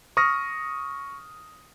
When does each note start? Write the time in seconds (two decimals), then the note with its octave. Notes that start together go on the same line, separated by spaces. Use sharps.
0.17 C#6 D#6 F6 A#6